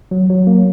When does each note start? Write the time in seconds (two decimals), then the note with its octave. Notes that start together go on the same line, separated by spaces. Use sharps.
0.11 F#3
0.30 F#3
0.47 A#3